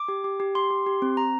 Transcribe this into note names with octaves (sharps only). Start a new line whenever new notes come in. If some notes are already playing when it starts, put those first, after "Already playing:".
Already playing: D6
G4
G4
G4
G4 C6
G4
G4
C4
C4 A#5